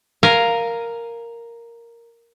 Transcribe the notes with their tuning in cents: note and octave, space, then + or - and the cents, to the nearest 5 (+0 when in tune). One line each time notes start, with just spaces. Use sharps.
A#4 +0 F5 +0 G#5 +0